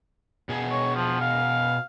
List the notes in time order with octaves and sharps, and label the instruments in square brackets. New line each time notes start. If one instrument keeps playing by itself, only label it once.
[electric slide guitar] B2 G#4
[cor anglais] C#5
F3
F5